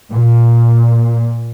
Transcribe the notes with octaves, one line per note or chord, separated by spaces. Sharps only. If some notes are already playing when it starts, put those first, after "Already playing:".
A#2